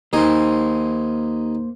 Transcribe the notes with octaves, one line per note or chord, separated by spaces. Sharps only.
D#2 A#3 D#4 C5 G#5